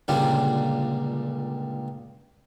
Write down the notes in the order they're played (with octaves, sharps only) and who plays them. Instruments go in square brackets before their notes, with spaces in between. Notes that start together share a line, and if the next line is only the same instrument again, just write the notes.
[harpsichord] C#2 A#2 D3 G3 A#3